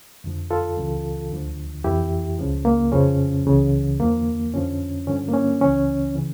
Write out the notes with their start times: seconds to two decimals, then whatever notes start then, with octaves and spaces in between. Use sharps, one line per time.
0.24 F2 D3 F3
0.51 F4 A4
0.77 C#2 C#3 E3
1.31 D2 D3 F3
1.84 F2 E3 E4 G4
2.39 C#2 C#3 F3
2.65 A#3
2.92 F2 C#3 F3 C#4
3.46 C#2 C#3 E3
3.99 E2 D3 F3 A#3
4.53 F2 D3 F3 C#4
5.07 G2 D3 F3 C#4
5.29 A#3
5.34 C#4
5.61 C#2 C#3 E3 C#4
6.15 C#3 E3